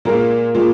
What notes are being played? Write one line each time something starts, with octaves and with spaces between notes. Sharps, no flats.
A#2 G#3 A#3 F4 A#4
A#2 G#3 F4